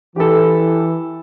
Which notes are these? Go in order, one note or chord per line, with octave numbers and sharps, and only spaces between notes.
E3 G4 A4